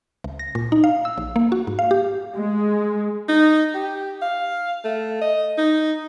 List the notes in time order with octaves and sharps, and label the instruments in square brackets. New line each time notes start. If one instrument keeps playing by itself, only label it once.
[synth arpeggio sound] C#2
A#6
A#2
D#4
F5
E6
A#1
A#3
F#4
G#2
F5
G4
[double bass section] G#3
[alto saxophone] D#4
G4
F5
A3
D#5
D#4